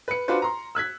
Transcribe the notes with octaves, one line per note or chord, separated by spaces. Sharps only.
B4 C#7
D4 F4 F#4 B4 C5
A#5 C6
E6 F#6 G#6 B6